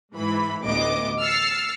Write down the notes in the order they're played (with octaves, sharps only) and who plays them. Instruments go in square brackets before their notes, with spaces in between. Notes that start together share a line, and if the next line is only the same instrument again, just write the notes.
[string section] G#2 E3 B5
A1 D2 B3 D#5 D6
E6 F6 A6 C7 C#7